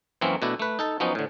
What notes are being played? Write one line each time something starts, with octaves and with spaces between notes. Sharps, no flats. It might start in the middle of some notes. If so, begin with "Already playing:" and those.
F#2 E3 F#3 A#3 C4 C#4
B2 A3 D4 E4
A3 B4
D#4 A4 A5
F3 F#3 B3 C#4 D#4
A2 D3